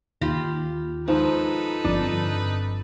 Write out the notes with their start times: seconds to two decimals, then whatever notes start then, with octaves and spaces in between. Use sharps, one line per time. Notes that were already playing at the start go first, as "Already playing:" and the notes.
0.21 D#2 F4 G4 B5
1.08 G#2 F3 D#4 A4 B4
1.84 G1 F2 D4 A6